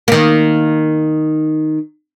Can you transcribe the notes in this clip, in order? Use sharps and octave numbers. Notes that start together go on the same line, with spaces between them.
D#3 A#3